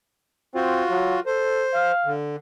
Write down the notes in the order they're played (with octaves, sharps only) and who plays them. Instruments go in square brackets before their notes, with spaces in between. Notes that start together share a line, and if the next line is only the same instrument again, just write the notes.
[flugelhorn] C4 [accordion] F4 F#4
[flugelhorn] F#3
[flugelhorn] A4 [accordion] C5
[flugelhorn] F5
[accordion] D3